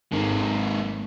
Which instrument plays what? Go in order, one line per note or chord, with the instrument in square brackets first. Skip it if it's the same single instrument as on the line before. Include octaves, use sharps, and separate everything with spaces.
[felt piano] G#1 [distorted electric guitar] G#3 A#3